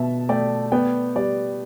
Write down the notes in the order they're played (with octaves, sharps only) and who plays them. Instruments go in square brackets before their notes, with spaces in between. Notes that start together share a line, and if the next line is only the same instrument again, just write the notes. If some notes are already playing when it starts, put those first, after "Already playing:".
Already playing: [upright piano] B2 [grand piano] E5 A5
[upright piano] A3 [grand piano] D5 G5
[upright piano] B3 [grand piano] D5 G5
[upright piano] G3 [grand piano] D5